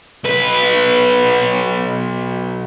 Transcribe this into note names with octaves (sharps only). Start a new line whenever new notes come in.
B1 B4